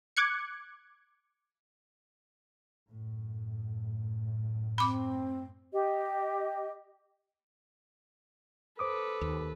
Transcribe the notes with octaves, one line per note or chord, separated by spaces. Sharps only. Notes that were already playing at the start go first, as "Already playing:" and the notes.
D6 F#6 G#6 C#7
F#2 A2
C4 B5 D6
G4 D#5
A4 B4 C5 D6 D#6
D#2